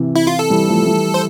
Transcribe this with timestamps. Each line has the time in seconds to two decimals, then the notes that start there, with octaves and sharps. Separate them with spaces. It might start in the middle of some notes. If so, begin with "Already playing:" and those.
Already playing: C3 E3
0.16 E4
0.27 F4
0.39 A4
0.50 E3 G3
0.68 F3 A3
0.86 E3 G3
1.14 C5